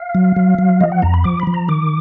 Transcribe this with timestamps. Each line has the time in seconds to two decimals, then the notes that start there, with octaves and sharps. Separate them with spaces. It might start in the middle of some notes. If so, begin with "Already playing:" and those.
Already playing: F5
0.15 F#3
0.36 F#3
0.58 F#3
0.81 F3 D#5
0.92 F#5
1.02 F2 A#5
1.14 B5
1.24 F3 D6
1.40 B5
1.47 F3
1.54 A#5
1.68 D#3 D6